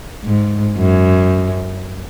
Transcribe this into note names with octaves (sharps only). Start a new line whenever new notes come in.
G#2
F#2